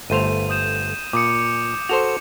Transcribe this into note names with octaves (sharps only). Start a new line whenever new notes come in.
G1 A3 C5 D#7 F7
D#6 G6 E7
A#2 D6 D#6 C#7
F#4 A4 C5 F7